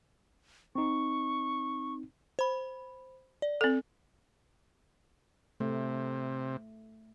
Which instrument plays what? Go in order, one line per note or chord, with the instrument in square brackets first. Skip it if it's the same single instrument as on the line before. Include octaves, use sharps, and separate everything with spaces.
[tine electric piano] C4 D#4 [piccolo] C#6
[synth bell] C5 B5
D5
[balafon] C4 A4
[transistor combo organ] C3 [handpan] A3